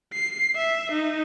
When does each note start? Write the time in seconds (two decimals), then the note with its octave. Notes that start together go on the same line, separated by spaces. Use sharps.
0.13 C7
0.56 E5
0.92 D#4